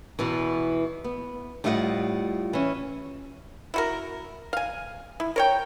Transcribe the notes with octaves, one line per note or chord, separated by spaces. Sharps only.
E2 B2 E3
B3
A2 G3 E4 F4 D#5 F#5
E3 C#4
E4 F#4 A#4
F5 G#5
E4
A#4 C#5 G5